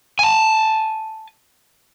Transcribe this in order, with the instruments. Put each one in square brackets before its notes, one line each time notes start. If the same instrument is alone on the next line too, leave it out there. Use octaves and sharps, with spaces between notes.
[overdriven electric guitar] G#5 A5